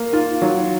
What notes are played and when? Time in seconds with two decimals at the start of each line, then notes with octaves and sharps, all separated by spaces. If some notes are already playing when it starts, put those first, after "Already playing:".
Already playing: A#3
0.13 D#4 F4
0.42 F#3 D#4